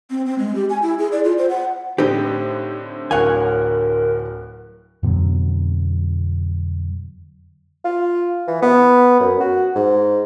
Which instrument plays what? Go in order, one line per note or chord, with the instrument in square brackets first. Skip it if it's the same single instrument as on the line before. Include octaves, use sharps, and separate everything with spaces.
[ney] C4
C4
G#3
G4
G#5
E4
G#4
D5
F4
C5
F#5
[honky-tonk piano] A2 D3 C4 [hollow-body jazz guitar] D#4 G4
[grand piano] D1 F#5 F#6 [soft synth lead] A#4 [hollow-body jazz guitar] C#5 F5 G#5
[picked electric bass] F2 B2 D3 F#3
[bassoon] F4
E3
B3
F#2
F#4
G#2